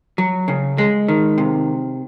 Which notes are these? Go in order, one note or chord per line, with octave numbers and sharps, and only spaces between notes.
F#3
C#3
G#3
D#3
C3